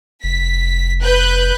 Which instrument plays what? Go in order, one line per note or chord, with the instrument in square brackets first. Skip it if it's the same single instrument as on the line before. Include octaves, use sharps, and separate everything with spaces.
[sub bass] F1 [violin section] B6
[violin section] B4 F#6 G6